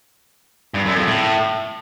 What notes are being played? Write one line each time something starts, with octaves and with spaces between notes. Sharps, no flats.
G2
F#2
F2
A2